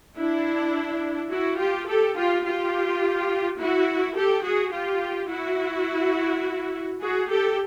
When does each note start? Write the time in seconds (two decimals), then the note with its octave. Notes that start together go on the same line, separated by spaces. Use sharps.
0.17 D4 E4
1.32 E4 F#4
1.60 F4 G4
1.88 G4 A4
2.17 F4 G4
2.46 F4 G4
3.59 E4 F#4
4.16 G4 A4
4.45 F#4 G#4
4.74 F4 G4
5.31 E4 F#4
7.01 F#4 G#4
7.30 G4 A4